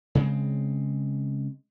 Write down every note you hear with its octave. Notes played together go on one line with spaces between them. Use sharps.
C#3 G#3 C4